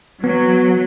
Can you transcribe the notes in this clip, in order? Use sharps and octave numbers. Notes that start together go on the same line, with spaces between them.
F#3 B3